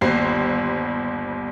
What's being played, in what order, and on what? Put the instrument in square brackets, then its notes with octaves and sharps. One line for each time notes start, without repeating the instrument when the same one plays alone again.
[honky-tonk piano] G1 D#2 G3 C5 C7